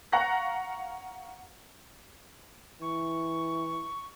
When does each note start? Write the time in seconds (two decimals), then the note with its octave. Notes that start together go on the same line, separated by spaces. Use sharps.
0.12 F5 F#5 A#5 C#6 F#6 A#6
2.81 E3 C#6